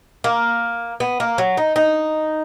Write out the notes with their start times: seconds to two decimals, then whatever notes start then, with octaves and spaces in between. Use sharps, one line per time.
0.24 A#3
1.00 B3
1.20 A#3
1.38 F#3
1.57 D#4
1.76 D#4